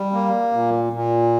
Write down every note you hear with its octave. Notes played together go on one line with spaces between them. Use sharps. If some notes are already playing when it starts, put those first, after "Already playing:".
Already playing: G3
A#3
A#2
A#2